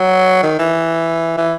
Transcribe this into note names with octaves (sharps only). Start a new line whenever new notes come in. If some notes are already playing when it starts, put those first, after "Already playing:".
Already playing: F#3
D#3
E3
E3